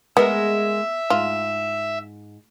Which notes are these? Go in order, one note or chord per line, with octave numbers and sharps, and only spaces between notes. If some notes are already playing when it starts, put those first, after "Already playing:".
G#3 B3 A#4 E5
G#2 F4